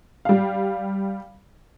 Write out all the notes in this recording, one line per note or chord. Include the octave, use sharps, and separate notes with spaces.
G3 F5